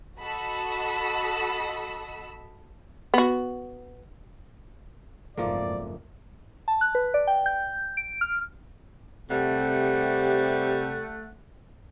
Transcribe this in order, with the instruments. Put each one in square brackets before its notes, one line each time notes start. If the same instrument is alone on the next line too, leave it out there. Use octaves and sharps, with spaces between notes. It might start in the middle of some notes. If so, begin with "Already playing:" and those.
[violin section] F#4 A4 D#5 B5 E6
[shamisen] B3 F#4
[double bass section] F#1 F2 G#2 [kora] F3 A3 A#3 [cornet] D5
[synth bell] A5
F#6
B4
D5
G5
G6
D7
F6
[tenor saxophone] C3 [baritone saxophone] G3 [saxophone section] A3 F#5